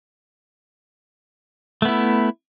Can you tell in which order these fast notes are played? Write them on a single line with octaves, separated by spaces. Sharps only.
A3 B3 E4